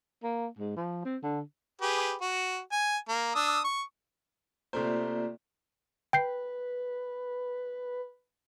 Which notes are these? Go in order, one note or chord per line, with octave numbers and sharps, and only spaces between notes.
A#3
G#2
F3
C4
D3
G4 G#4 B4
F#4
G#5
A#3
D4 D#6 E6
C#6
C3 A3 A#3 F4 C5 D5
B4 G5 G6 C7